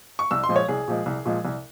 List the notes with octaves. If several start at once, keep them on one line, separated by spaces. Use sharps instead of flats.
C#6
C2 E6
C6
A#2 F3 G#3
C#5
C2 G#4
A#2 F3 G#3
C2
A#2 F3 G#3
C2